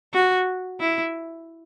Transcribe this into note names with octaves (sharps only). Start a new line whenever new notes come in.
F#4
E4